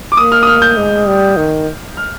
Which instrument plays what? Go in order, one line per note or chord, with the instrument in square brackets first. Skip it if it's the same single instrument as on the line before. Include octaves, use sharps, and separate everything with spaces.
[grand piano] D6
[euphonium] A#3 [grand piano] D#6
[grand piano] F6
D#6
F6
G6
[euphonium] G#3
G3
D#3
[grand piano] F6